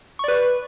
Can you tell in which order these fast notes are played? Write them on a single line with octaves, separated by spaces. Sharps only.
C#6 D5 B4